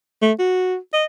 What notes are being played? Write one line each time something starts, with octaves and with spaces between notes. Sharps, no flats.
A3
F#4
D#5